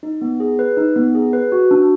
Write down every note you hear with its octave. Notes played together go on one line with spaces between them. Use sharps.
D#4
B3
G#4
B4
D#4
B3
G#4
B4
F#4
D4